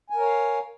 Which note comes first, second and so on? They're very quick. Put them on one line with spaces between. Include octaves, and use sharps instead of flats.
G#5 A#4 C#5 F5